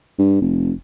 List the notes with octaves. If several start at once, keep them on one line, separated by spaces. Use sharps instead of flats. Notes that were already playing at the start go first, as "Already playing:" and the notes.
G2
F1